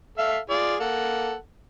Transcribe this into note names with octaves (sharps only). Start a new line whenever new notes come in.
A4 E5 F5
F4 G#4 D5
A#3 A4 F#5